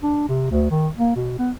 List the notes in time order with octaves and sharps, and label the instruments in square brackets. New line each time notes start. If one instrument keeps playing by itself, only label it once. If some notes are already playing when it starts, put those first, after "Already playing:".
[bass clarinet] D4
C3
D2
D#3
A#3
B2
B3